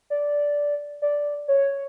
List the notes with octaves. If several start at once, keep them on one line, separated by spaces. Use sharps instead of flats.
D5
D5
C#5